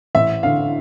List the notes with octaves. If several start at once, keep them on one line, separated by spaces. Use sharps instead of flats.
A1 E5
D3 F5